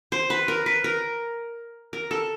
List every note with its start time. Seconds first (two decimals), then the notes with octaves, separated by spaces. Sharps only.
0.12 C5
0.30 B4
0.48 A#4
0.66 B4
0.84 A#4
1.93 A#4
2.11 A4